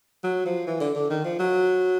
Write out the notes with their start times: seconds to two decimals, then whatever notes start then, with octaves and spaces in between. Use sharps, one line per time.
0.24 F#3
0.46 F3
0.67 E3
0.80 D3
0.95 D3
1.10 D#3
1.24 F3
1.39 F#3